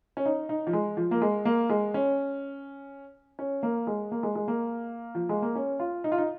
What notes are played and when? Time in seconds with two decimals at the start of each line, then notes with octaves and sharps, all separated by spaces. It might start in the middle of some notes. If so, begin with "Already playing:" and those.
0.17 C#4
0.26 D#4
0.49 D#4
0.67 F3
0.73 G#3
0.97 F3
1.11 A#3
1.22 G#3
1.45 A#3
1.70 G#3
1.94 C#4
3.39 C#4
3.63 A#3
3.87 G#3
4.12 A#3
4.23 G#3
4.35 G#3
4.48 A#3
5.15 F3
5.29 G#3
5.42 A#3
5.56 C#4
5.80 F4
6.04 D#4
6.12 F4
6.18 D#4